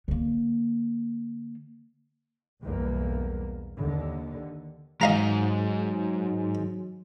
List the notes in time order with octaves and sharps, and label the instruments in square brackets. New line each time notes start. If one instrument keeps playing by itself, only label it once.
[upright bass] D3 A#3
[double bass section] B1 E2 G2 A#3
D#2 D3
[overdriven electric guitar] G#2 [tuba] F#3 [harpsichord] D#5 F5 A#5